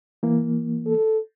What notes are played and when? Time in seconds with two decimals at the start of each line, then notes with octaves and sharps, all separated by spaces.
0.23 E3 A#3
0.86 A4